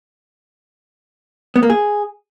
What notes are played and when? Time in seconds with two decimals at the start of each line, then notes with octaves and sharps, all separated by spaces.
1.56 B3
1.63 A#3
1.70 G#4